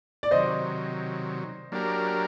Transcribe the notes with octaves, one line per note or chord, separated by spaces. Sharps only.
D5
C3 D#3 F#3 C5 D#5
F#3 A#3 D4 G4 A#4